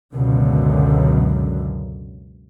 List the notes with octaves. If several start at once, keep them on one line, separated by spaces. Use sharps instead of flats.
C#2 F#2 B2 D3